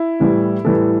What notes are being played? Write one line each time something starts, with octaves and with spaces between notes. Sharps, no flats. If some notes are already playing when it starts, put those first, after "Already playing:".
Already playing: E4
A2 E3 G3
A2 E3 G3 A4